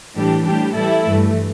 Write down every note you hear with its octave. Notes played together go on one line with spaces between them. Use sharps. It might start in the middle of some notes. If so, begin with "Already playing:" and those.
A2 E3 G3 D4 G4
A2 G3 D4 G4
E3 G3 E4 A4
G2 E3 A3